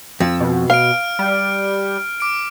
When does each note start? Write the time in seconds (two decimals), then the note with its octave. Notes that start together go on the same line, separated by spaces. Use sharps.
0.20 F2 E6
0.40 B2
0.70 F5 F6 D7
1.19 G3
2.20 D6 D7